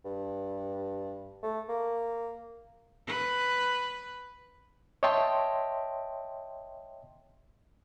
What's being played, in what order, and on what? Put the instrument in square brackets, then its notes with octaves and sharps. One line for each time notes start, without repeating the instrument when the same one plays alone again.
[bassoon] G2
A3
A#3
[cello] B4
[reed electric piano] C#5 D#5 E5 G5 A5 C6